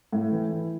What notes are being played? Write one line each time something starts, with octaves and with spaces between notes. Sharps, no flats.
A2
E3
E4